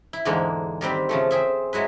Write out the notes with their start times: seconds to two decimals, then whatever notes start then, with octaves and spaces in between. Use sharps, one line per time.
0.13 E4
0.25 E2 G#2 D3 G#3 A#3
0.81 D#3 G3 C4 B4
1.09 C#3 F3 A3
1.31 C4 G#4 E5
1.73 F#3 G#3 E4 B4